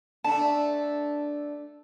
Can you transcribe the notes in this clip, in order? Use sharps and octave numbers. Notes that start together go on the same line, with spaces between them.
A3 D4 A5